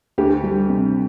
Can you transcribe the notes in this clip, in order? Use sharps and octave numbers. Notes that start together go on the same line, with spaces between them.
D2 G4
G3
C3